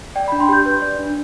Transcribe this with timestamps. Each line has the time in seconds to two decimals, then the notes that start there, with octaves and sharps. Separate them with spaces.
0.16 D5 G5
0.28 B5
0.32 D4
0.40 C6
0.49 G4 G6
0.66 B4
0.82 D5
0.99 D4